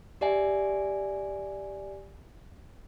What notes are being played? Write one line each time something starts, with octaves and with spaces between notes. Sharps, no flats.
G4 D5 E5 G#5